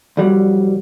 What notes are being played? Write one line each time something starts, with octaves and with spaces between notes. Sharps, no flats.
C2 F2 F#3 G3